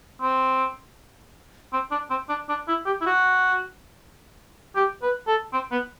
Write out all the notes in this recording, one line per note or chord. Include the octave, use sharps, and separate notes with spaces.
C4
C4
D4
C4
D4
D4
E4
G4
E4
F#4
G4
B4
A4
C4
B3